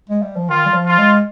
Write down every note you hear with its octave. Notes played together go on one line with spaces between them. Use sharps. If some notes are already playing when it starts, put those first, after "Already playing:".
G#3
G3
F3
D#3 F4
G3
F3
F4
G#3